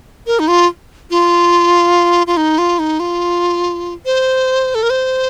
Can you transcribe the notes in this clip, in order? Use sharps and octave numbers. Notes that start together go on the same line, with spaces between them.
A#4
D#4
F4
F4
F4
D#4
F4
D#4
F4
C5
A4
A#4
C5